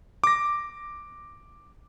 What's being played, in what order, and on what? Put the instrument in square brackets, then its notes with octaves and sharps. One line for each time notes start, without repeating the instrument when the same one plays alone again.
[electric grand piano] D6 A#6